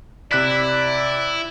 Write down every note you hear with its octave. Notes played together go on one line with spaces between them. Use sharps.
C3 E4 D5 F#6 B6